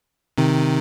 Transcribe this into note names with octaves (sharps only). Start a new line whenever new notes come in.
C3 D#3